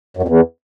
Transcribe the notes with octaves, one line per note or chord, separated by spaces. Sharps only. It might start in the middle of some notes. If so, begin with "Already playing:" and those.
F#2
F2
E2